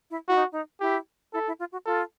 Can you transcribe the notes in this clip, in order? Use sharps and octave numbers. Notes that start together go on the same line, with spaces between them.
E4
E4 F#4
D#4
D#4
E4 G4
E4 A4
E4
F4
F#4
F4 A4